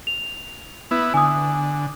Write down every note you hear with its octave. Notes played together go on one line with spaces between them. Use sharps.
F7
B3 E4
D3 G#5 D#6